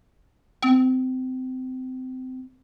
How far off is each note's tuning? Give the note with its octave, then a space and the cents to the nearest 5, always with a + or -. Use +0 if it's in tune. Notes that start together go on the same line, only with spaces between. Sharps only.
C4 -25